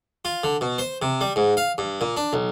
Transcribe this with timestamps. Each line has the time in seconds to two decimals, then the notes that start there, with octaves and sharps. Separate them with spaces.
0.25 F4
0.44 D3
0.61 B2
0.78 C5
1.02 C3
1.21 G3
1.36 G#2
1.57 F5
1.78 G2
2.01 A#2
2.17 D4
2.33 B1